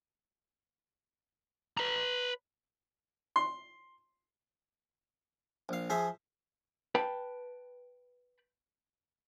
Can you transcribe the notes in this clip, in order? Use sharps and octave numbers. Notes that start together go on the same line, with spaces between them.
B4 A#5
C6
A#1 F5
F3 G#4 C5 E5
B4 G5 A5 B5